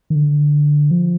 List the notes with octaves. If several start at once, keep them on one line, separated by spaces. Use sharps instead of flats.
D#3
D3
F3